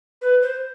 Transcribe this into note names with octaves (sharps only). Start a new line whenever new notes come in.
B4
C5